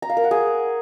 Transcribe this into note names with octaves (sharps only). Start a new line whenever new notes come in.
A#5
F5
A#4
F#5
G#4